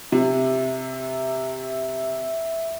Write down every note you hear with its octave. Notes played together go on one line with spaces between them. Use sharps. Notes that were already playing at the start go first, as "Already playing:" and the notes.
C3 E5